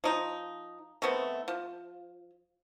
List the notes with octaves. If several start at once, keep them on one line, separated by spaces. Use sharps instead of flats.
F3 D#4
D#3 A3 B3 C4
F3